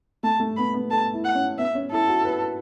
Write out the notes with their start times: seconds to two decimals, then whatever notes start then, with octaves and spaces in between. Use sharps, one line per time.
0.23 A3 A5
0.40 A3
0.57 B3 B5
0.74 B3
0.90 A4 A5
1.14 E4
1.24 F#5
1.35 C#4
1.58 B3 E5
1.75 C#4
1.91 E4 A4
2.08 F#4
2.25 B4